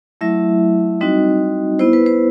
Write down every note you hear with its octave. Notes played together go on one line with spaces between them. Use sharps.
F#3 A3 E4 E5
G3 C4 D#4 F#4 D#5
B3 E4 C5
B4
C5